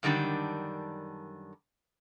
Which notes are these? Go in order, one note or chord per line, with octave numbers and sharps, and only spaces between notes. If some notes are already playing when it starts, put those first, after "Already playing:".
F#2 D3 D#3 G3 D4